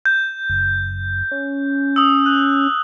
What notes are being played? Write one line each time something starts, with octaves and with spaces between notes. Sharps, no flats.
G6
F#1
C#4
D#6 E6
F#6